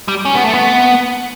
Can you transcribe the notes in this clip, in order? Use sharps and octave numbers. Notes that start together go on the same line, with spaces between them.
G3
C#4
B3
A3
B3